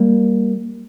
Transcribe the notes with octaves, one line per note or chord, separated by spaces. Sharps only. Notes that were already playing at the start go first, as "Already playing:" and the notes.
Already playing: G3 A#3